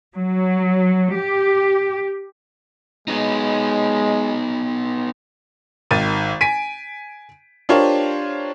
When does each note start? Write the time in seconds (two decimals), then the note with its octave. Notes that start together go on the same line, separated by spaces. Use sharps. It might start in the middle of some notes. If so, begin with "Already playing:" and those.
0.15 F#3
1.15 G4
3.08 G#3 B3 D#4
5.91 G#1 D#3 A6 D#7
6.41 G#5 B6 D7 D#7
7.69 D4 F4 G4 A#4 C5 C#5